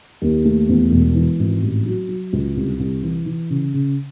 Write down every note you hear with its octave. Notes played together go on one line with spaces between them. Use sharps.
D#2
A3
E2
E1
E3
G#1
A1
F#3
F#3
C#2
C2
C2
E3
E3
C#3
C#3